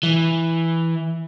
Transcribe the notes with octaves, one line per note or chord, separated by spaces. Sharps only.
E3